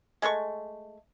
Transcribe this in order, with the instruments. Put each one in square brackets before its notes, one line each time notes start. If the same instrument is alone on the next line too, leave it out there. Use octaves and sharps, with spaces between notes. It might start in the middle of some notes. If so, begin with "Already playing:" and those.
[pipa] G#3 A3 A#4 C#6